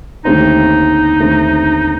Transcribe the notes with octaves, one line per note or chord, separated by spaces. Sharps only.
D#2 D3 A3 C4 D#4
D#2 D3 A3 C4